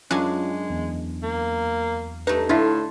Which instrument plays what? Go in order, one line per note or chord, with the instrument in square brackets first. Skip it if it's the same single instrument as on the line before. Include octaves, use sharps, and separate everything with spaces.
[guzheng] F#2 D4 G#5 [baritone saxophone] G#3 [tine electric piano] C#4 F4 [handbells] F#6
[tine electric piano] E2
[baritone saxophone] A#3
[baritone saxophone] G2 [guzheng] A3 D#4 [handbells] B4
[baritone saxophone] A2 [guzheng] D3 F4 [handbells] D4 E4 E5